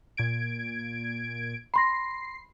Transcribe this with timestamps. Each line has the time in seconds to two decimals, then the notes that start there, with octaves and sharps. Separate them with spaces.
0.17 A#2 G#6 D7
1.74 B5 C6 A#6 C7